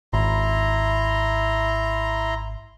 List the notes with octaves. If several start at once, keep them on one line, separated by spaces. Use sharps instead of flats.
G#1 E4 A#5 C6